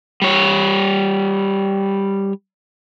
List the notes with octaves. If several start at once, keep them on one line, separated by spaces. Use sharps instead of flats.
G3 C#5